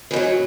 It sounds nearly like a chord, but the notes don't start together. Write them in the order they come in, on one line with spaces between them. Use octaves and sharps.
E3 G#2 F#3